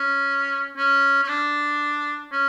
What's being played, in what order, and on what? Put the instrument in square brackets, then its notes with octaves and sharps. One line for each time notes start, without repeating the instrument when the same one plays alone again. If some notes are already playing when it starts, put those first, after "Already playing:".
Already playing: [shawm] C#4
C#4
C#4
D4
C#4